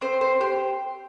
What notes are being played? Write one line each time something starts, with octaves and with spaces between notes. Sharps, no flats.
C4 C5
C5
G4 C5